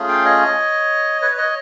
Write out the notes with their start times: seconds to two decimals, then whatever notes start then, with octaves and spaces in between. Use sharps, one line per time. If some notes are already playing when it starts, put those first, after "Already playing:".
Already playing: A3 C#4 F4 G#4
0.08 F5 G5
0.25 C#5 D#5
1.22 B4 C#5
1.38 C#5 D#5